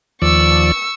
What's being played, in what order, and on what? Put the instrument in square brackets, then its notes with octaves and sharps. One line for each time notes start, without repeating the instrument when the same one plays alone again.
[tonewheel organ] D#2 F3 D5 [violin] C#6 E6